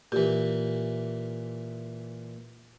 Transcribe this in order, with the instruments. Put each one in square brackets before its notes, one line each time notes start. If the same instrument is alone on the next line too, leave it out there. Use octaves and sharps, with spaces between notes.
[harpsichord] A#2 E3 [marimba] G4